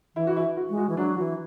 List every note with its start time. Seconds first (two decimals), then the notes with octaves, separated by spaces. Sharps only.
0.16 E3 E4
0.27 F#4
0.37 E4
0.57 F#4
0.70 G#3
0.77 F#4
0.89 E3
0.97 F#3 D4
1.18 E3 F#4